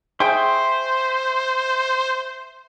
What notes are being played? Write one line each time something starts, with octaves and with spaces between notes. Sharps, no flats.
G#4 C5 E5 G5 C6 C#6